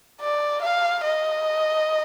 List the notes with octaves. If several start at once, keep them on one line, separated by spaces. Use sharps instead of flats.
D5
F5
D#5